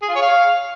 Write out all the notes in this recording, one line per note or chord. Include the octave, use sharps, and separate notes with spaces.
G#4
F4
C#5
F5